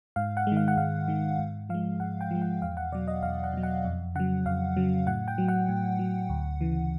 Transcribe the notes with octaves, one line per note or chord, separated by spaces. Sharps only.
G#2 F5
F#5
G#3
D#3
F5
F#5
G#2 F5
D#3 G#3
G#2
F3 G#3 F5
G#2 F#5
G5
F3 G#3
F#5
E2 F5
F#5
B2 F#3 D5
D#5
E2 F5
F#5
B2 F#3
F#5
F2
C#3 F#3 F#5
F2 F5
C#3 F#3
A2 F#5
G5
F#3
F#5
A2
F#3
D2
C#3 E3